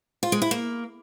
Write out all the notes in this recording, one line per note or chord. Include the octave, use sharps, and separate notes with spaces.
F4
G#3
E4
A#3